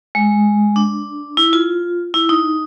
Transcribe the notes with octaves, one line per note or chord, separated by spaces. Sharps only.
G#3
D4
E4
F4
E4
D#4